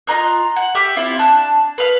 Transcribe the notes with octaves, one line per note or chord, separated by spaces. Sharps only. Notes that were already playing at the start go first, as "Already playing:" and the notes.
F4 D#5 A#5 F#6
F#5
G4 E5 F6
C4 E4 F4
D4 A5 F#6
B4 F5